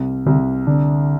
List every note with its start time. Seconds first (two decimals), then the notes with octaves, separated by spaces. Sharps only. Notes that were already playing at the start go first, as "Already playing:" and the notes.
Already playing: C2
0.26 C2 D3
0.67 D3 D4